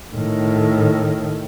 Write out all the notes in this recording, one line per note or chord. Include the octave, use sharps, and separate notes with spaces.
A2 D#3